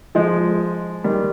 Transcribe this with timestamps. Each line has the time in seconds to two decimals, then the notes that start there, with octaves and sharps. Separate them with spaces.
0.15 F3 G#3
1.04 D#3 G3